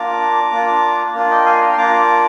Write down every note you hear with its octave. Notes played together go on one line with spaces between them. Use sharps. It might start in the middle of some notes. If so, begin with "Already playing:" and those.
Already playing: A#3 D4 F4 A#5 D6
A#3 D4 F4
A#3 D4 F4
D#5 G5
F5 G#5
G5 A#5
C6
A#3 D4 F4 A#5 D6